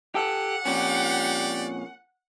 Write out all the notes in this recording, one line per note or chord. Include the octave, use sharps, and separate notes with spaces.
G4 A4 F#5
F2 A#2 C#4 G4 D5